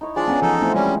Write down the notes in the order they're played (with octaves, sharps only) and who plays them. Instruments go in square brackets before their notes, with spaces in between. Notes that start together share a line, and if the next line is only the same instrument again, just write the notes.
[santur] D#4 E4 C#5
[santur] F3 G#3 G#4 [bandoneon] D4 D5
[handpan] B3 C#4 [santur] F#5 A#5 D#6
[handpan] E3 F3 [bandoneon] D#4 A4
[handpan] A3 C4 E4
[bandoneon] G3 C#4 [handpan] G#3